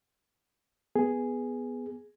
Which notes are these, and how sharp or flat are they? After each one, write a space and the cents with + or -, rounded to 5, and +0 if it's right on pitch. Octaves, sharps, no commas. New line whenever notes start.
B3 +0 G#4 +0